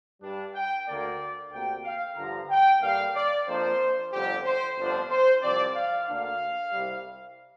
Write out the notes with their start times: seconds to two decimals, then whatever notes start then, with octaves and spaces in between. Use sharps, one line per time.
0.22 G2 G3 D4
0.55 G5
0.87 D2 D3 A#3 D5
1.52 D2 C3 A#3 D4 G5
1.85 F5
2.17 G2 D3 F3 A#5
2.50 G5
2.82 G2 D3 G3 A#3 F5
3.15 D5
3.47 F2 F3 A#3 D4 C5
4.12 G1 F2 D3 G4
4.45 C5
4.77 G1 F2 F3 D4 C5
5.09 C5
5.42 C2 C3 F3 C4 D5
5.75 F5
6.07 D2 D3 A#3 D4 F5
6.72 C2 C3 G3